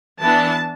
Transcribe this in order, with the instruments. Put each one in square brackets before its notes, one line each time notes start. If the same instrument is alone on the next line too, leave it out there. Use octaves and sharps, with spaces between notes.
[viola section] E3 B3 D4 A5